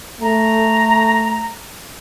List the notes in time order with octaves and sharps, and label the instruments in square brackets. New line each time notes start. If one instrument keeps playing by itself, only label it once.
[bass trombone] A3 [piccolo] A#5